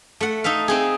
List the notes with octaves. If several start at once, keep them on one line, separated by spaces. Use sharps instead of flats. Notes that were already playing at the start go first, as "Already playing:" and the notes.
A3 F#5
D#4 A4 E5 F5
C4 D#4 G#4